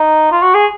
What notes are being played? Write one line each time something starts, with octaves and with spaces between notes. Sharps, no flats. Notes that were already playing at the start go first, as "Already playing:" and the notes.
Already playing: D#4
F4
F#4
G#4